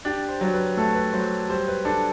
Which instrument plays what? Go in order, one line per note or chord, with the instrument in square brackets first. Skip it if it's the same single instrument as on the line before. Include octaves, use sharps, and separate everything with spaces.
[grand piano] D4 [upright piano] G4
[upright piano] C5
[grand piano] F#3
[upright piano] B4
[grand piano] A3 [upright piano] A4
[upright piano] B4
[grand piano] F#3 [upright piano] C5
[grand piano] G3 [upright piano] C5
[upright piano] B4
[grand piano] D4 [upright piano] A4